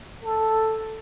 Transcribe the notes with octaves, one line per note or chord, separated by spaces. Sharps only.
A4